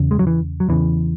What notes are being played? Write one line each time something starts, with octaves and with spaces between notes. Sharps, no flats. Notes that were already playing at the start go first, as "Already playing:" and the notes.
Already playing: E2 C#3
G#3
F#3
E3
F#3
E2 C#3 E3